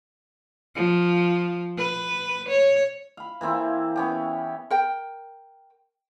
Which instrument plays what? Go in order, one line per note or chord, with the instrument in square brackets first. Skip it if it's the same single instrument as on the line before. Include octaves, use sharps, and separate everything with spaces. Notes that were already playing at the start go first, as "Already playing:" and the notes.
[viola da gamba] F3
B4
C#5
[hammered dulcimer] F5 B5
E3 A#3 C4 E4
B3 C#4 G4
[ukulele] A#4 G5